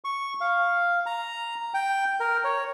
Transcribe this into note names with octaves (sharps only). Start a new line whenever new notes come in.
C#6
F5
A#5
G5
A#4
C#5